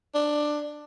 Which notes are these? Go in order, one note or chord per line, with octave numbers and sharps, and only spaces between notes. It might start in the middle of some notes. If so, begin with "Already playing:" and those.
D4